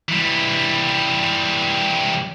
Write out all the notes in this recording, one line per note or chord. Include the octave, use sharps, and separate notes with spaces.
E3 G3